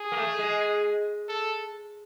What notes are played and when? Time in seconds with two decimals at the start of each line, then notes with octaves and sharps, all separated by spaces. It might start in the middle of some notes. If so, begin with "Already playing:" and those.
Already playing: G#4
0.12 A#3
0.16 A3
0.38 G#3
1.29 A4